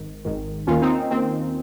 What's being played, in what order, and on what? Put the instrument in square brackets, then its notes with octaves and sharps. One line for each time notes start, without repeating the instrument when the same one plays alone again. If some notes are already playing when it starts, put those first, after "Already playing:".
Already playing: [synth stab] G#1 G#2 D#3
G#1 G#2 D#3
D#2 D#3 C#4 F4
C4 D#4
D#2 D#3 C4